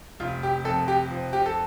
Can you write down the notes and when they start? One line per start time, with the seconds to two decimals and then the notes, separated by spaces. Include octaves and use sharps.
0.20 F1 F4
0.43 G4
0.65 F2 A4
0.88 G4
1.10 F3
1.33 G4
1.46 A4